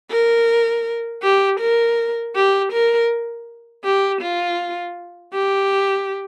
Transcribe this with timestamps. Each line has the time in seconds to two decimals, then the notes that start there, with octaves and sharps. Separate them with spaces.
0.11 A#4
1.23 G4
1.60 A#4
2.36 G4
2.73 A#4
3.85 G4
4.22 F4
5.34 G4